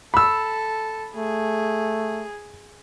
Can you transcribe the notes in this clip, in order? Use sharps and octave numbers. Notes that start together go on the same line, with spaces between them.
A4 B5 E6
A3 G#4